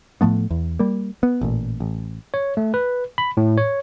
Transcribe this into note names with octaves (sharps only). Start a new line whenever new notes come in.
A2 F3 A3 B3
E2
G3 A#3
B3
A1 A#2
A1
C#5
A3
B4
B5
A2
C#5